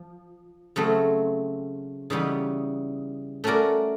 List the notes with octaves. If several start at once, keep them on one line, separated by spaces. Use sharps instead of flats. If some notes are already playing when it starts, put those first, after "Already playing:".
Already playing: F3
C#3 F#3 A3 C4
C#3 E3 G3 B3 D#4
A3 C#4 F#4 A#4 D5